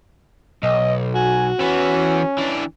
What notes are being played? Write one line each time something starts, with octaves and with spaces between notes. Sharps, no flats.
B1 D#5
F#4 G#5
E3 B3 C#4
E3 D4